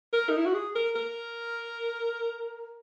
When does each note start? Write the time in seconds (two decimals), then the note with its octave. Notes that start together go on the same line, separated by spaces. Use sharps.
0.13 A#4
0.29 D#4
0.37 E4
0.46 F#4
0.54 G#4
0.75 A#4
0.96 A#4